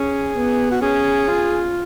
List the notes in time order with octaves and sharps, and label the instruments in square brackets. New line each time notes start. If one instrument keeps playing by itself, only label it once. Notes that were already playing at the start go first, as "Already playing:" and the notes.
Already playing: [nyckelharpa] C#4 [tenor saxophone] G#4
[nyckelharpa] B3
[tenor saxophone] F#4
[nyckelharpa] C#4 [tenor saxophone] G#4
[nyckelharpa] F4